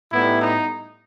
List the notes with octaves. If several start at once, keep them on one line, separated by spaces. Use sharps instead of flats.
A2 G3 B3 D#4 E4
D#4